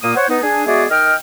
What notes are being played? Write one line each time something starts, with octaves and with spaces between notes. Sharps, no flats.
A#2 A#3 D#6
C5 C#5 F#5
B3 D#4
D4 G#4 G#5
G#3 B3 F#4 G#4 D5 E5
D#3 D#5 G5 F6